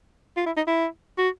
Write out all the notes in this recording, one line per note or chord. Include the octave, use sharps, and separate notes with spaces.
F4
E4
D#4
E4
F#4